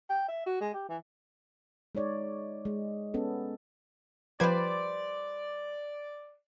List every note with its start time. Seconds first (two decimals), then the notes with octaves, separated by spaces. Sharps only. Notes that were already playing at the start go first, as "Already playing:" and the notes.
0.09 G5
0.28 E5
0.46 F#4
0.61 G#3
0.73 G4
0.89 E3
1.95 G#3 D#4 C#5 D5
2.65 G#3
3.14 B3 C#4 A4
4.40 F3 G3 B4 C5 D5 B5 G#6